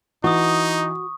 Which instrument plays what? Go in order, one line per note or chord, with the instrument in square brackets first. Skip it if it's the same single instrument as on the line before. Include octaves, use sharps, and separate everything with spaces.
[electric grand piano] E3 [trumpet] D#4 [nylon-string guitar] F#4 [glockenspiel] C#6 D#6